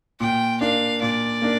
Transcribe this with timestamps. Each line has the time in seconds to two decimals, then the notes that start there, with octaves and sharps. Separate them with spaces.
0.20 A#2 G5
0.61 A#3 D4 F5
1.01 A#2 D5
1.42 A#3 D4